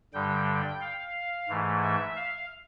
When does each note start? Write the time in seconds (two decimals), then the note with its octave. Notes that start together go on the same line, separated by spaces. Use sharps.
0.13 G2 D3 G3 G5
0.81 F5
1.49 G#2 E3 A3
1.83 E5
2.16 F5